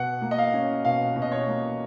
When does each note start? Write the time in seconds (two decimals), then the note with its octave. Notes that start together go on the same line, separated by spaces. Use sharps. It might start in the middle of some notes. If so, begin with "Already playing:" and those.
Already playing: B2 F#5
0.22 A#3
0.31 D#5
0.38 F5
0.54 C#4
0.85 B2 F5
1.16 B2
1.22 D#5
1.32 C#5
1.48 A#3